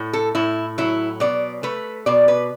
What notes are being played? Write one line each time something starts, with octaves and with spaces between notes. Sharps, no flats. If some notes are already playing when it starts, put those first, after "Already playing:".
Already playing: A2 A3
A4
A2 E4
F#3 E4
B2 D5
A3 B4
B2 D5
B4